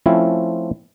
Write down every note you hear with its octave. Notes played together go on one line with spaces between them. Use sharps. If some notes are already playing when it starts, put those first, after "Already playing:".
F3 A3 C4 C#4 E4 F4